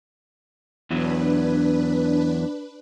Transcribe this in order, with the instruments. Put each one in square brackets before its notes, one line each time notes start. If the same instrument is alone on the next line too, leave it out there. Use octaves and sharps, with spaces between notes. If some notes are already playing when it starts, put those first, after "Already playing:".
[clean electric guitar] E2 E3 F#3 [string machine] D4 B4